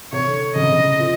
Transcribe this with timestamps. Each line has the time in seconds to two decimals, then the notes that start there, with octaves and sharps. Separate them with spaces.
0.12 C3 C#5
0.27 D3
0.55 C#3 D#5
0.63 C3
0.72 C#3
0.99 F3